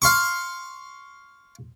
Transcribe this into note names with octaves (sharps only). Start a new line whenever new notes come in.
F5 C6 C#6